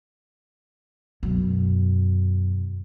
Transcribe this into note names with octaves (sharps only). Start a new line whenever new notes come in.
F#2 B2